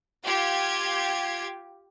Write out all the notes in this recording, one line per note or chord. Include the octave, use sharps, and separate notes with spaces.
F4 G4 G#6